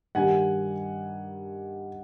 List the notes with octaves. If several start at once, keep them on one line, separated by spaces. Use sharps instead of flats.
G2 D#3 G3 F#5 G#5